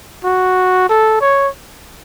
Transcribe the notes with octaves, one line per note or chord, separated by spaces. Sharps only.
F#4
A4
C#5